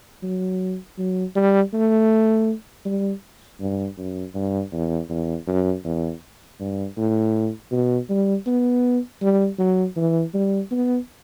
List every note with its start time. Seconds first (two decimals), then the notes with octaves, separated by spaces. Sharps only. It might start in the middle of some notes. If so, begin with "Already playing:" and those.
0.23 F#3
0.98 F#3
1.35 G3
1.73 A3
2.85 G3
3.60 G2
3.98 F#2
4.35 G2
4.73 E2
5.10 E2
5.47 F#2
5.85 E2
6.60 G2
6.97 A2
7.72 B2
8.09 G3
8.47 B3
9.22 G3
9.59 F#3
9.97 E3
10.34 G3
10.71 B3